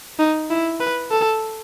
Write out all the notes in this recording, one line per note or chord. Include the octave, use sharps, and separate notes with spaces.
D#4
E4
B4
A4